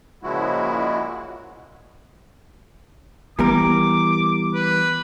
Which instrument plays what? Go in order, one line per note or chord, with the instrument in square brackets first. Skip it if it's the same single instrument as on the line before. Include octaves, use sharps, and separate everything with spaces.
[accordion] A#2 C#3 F3 G#3 E4 F#4
[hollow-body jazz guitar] E3 G3 A#4 [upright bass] B3 [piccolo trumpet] D6
[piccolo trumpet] B4